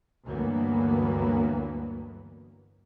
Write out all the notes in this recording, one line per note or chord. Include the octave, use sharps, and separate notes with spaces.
D2 G2 E3 F#3 A#3 B3